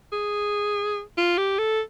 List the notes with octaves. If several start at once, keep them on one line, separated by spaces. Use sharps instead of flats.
G#4
F4
G4
A4